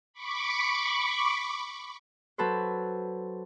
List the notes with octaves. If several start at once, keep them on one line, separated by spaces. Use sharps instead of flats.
B5 C#6 D6
F#3 A4 B4 C5